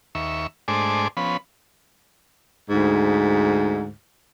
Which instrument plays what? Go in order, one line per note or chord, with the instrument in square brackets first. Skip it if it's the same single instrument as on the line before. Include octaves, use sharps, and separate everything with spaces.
[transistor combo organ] D#2 E5 C#6
G#2 A3 D4 C5 G#5 D6
F3 B3 C#4 B5
[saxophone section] D2 G#2